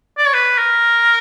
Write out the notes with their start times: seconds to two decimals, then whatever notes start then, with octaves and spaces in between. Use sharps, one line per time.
0.18 D5
0.26 C#5
0.34 B4
0.58 A#4